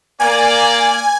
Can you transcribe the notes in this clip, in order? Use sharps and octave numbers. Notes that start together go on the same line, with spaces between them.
A#3 D5 G#5